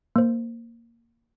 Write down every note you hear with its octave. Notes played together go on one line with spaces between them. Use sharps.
A#3 C5